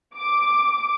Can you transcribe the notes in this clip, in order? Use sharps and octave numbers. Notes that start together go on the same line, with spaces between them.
D6